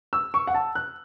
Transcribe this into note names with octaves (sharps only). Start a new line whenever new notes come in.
E6
C#6
F#5
A5
F#6